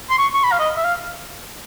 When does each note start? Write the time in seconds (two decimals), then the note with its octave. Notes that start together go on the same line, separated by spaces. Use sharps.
0.10 C6
0.18 C#6
0.34 C#6
0.44 B5
0.52 F5
0.60 D#5
0.77 E5
0.84 F5